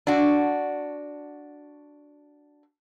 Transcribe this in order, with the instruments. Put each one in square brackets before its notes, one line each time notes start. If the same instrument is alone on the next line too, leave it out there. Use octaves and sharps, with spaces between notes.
[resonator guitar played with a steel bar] D4 F#4